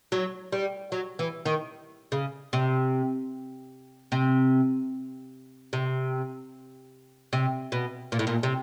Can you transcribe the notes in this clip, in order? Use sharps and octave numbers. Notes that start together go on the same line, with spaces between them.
F#3
G3
F#3
E3
D#3
C#3
C3
C3
C3
C3
B2
A#2
A2
A#2
C3